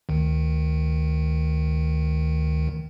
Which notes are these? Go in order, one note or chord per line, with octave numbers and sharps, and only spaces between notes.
D2 D#3